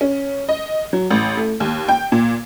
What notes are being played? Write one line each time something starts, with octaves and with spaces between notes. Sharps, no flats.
C#4
D#5
F#3
A1
A3
D#2
G5
A#2